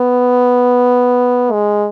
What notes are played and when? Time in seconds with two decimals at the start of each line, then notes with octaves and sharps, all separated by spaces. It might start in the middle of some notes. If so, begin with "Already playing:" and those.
Already playing: B3
1.52 G#3